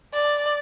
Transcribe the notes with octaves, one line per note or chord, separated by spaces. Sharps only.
D5